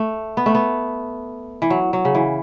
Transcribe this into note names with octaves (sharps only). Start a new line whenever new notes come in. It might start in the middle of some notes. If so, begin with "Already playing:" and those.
Already playing: A3
B3
A3
B3
E3
F#3
F#3
C#3
E3